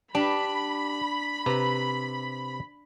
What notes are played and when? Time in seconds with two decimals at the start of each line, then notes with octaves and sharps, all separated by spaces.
0.15 D4 G4 B5
1.46 C3 B4 A#5